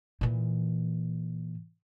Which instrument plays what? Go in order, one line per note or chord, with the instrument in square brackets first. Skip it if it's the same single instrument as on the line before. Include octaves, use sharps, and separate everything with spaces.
[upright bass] A#2 E3